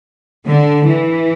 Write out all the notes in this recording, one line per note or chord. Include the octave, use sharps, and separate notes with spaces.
D3
E3